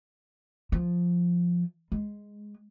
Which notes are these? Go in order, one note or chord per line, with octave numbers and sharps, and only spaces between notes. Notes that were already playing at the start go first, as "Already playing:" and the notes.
F3
G#3